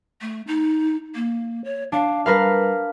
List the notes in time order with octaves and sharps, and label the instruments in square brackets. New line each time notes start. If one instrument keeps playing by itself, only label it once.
[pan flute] A3
D#4
A#3
C#5
[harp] D4 [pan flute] F5
[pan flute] G3 [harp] A#4 B4 F5